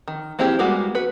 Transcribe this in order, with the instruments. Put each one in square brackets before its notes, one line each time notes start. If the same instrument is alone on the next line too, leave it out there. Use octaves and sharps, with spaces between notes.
[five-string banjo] D#3
A#3 C4 E4 G4 G#4
G3 G#3 A#3 B3 F#4
F#4 B4